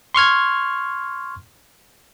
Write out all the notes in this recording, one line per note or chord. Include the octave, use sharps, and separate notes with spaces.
C6 C#6 F6 G#6